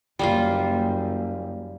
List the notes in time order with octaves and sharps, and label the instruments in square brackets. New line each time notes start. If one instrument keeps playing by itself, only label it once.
[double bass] F#1 [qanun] G3 A#3 F4